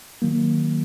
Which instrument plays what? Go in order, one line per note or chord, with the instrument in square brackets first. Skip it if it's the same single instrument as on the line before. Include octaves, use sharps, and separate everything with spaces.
[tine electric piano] D#3 F#3 A#3